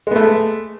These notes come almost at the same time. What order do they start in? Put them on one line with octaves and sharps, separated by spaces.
G#3 B3 A3